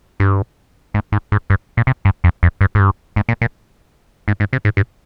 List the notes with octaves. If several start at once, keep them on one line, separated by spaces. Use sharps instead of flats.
G2
G#2
G#2
G#2
G2
A#2
C3
G2
F2
F2
G2
G#2
G2
G#2
A#2
A#2
G#2
G#2
C3
G#2
G2